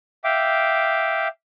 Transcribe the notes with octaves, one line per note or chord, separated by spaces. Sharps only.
E5 F5 G5 D6